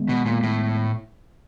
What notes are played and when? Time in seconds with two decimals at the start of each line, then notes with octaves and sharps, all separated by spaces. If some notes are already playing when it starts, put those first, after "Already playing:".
Already playing: D#3 G#3 B3
0.09 B2
0.26 A#2
0.43 A2